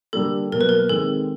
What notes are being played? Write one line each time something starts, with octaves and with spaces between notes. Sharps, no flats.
D3 G3 A#3 A4
B2 F#3 A#3 A#4
B4
A#4
D#3 G#3 C4 A4